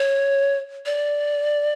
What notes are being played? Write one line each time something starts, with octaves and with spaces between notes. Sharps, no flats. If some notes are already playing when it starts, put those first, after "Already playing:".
Already playing: C#5
D5